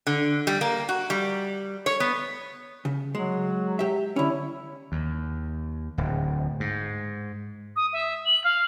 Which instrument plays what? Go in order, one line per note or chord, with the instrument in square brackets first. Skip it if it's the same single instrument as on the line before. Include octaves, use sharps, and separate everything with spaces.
[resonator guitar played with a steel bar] D3
G3
A#3
F#4
G3
C#5
B3
[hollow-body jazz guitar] C#3
[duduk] F#3 [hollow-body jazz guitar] G#3
[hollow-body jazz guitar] G4 E5
[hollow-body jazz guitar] D3 C#4 [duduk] E4
[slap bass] D#2
D1
G#2
[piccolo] D#6
E5
F#7
F5